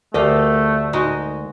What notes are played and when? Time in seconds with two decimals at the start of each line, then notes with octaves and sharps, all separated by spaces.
0.14 D2 A3 G4 A#4 D#5 F5
0.93 G#3 D#4 F#4